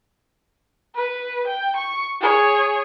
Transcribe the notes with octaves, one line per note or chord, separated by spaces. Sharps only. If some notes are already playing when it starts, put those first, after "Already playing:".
B4
G5
C#6
G#4 C#5